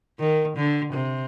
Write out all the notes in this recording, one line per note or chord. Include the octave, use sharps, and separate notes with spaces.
D#3
D3
C3